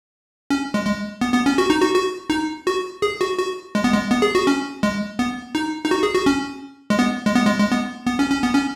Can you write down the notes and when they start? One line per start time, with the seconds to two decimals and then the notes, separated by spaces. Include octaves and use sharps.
0.50 C#4
0.74 G#3
0.85 G#3
1.21 B3
1.34 B3
1.46 C#4
1.58 F#4
1.70 D#4
1.82 F#4
1.95 F#4
2.30 D#4
2.67 F#4
3.02 G#4
3.21 F#4
3.38 F#4
3.75 G#3
3.84 B3
3.93 G#3
4.11 B3
4.22 G#4
4.35 F#4
4.47 C#4
4.83 G#3
5.19 B3
5.55 D#4
5.85 D#4
5.91 F#4
6.03 G#4
6.15 F#4
6.26 C#4
6.90 G#3
6.99 B3
7.26 G#3
7.35 B3
7.47 G#3
7.59 G#3
7.72 B3
8.06 B3
8.19 C#4
8.31 C#4
8.43 B3
8.55 C#4